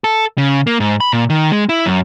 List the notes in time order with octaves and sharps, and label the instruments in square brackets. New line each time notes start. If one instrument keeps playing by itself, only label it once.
[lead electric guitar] A4
C#3
A#3
G#2
B5
A#2
D#3
G#3
E4
F#2